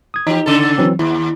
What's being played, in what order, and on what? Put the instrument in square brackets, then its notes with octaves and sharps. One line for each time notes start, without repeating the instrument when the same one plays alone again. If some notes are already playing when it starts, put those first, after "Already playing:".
[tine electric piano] D#6 G#6
[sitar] E3 G4 [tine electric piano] D#4
[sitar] C#3 A4
[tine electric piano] E3 F#3 C4
[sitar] D#2 [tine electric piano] E4